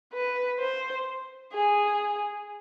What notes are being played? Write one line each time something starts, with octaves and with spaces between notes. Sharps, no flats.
B4
C5
G#4